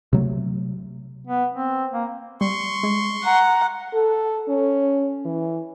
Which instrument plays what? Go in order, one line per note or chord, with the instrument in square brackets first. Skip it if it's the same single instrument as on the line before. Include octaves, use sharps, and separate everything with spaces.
[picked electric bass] C3 F#3 A3
[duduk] B3
C4
A#3
[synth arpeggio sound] G3 [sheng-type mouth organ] C6 C#6
[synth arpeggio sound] G#3
[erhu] F#5 [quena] A#5
[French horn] A4
C#4
E3